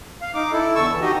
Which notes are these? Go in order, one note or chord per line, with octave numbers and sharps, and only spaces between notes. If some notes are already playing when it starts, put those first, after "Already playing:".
F5
D#4 D6
E4 A4
E2 D3 A5 C#6 E6
E3
D#4 F#4 G4 D#5